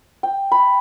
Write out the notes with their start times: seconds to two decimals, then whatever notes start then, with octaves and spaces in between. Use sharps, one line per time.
0.23 G5
0.52 B5